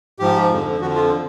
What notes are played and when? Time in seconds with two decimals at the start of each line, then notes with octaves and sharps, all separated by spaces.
0.19 G#2 F3 G4
0.51 F2 D3 F3
0.80 F2 D3 F3 F#4
0.95 F4